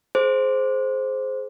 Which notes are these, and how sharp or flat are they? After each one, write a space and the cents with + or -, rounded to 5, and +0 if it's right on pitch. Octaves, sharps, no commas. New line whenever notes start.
G#4 +30 C5 +0